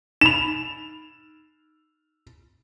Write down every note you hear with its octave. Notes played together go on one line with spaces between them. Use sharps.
D#4 B5 E7 F7